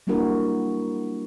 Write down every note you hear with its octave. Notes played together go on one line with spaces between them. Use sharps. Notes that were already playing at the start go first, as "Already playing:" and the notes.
G3 A#3 D4 E4 F#4 A#4